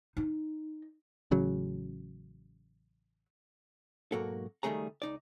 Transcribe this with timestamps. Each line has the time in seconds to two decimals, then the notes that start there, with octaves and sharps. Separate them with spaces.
0.17 D#4
1.31 A1 C#3 F#3
4.12 B1 G#2 F#3 A#3 F#4 A4
4.63 C#2 D#3 G3 A3 G#4 A#5
5.02 C#2 D#4 D5